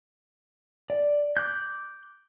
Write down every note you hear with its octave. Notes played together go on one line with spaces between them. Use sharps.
D5
D6 F#6 G6